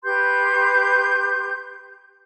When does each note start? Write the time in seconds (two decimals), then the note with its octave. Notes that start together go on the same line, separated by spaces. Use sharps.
0.03 G4 B4 C6 G6